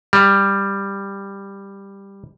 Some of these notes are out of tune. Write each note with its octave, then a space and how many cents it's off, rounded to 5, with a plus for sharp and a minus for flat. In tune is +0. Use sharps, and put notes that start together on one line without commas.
G3 +10